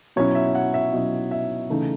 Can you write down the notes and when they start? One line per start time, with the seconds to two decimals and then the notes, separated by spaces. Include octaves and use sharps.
0.16 B2 F#3 C#4 E4 C#5
0.35 E5
0.55 F#5
0.74 E5
0.93 B2 F#3 C#4 E4 D#5
1.31 E5
1.70 C#3 E3 A3 D#4